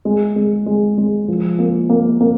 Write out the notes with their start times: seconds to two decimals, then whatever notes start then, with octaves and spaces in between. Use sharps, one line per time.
0.05 G#3
0.36 G#3
0.66 G#3
0.98 G#3
1.28 F3
1.59 A#3
1.89 A#3
2.21 A#3